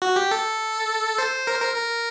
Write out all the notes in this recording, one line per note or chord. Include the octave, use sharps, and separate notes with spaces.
F#4
G4
A4
C5
A#4
C5
A#4
A#4